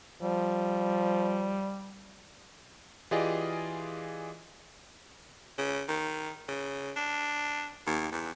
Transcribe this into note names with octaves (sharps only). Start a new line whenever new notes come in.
F3 G3
E3 F4 G4 G#4 D5 D#5
C#3
D#3
C#3
D4
D#2
E2